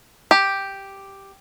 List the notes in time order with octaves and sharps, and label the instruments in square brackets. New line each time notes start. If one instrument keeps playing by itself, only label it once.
[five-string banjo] G4